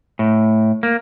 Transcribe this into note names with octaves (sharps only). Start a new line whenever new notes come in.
A2
A#3